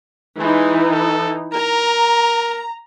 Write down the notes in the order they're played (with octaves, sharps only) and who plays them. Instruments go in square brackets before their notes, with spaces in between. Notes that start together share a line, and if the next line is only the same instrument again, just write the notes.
[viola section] E3 D#4 [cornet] G#3
[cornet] A4
[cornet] A#4 [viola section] A#5